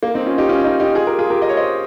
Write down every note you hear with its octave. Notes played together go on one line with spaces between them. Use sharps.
A#3
C4 D#4
C#4 F4
D#4 G4
C#4 F4
D#4 G4
D#4 G4
F4 G#4
G4 A#4
F4 G#4
G4 A#4
D#5
C#5
C5 D#5